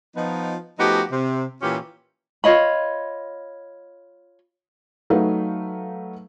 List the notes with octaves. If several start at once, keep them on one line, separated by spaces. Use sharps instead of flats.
F3 B3 D#4
F3 A3 B3 D#4 F#4 G4
C3
A#2 E3 C#4 F4 G4
F4 C#5 D#5 B5
F#3 A3 D#4 B4 F5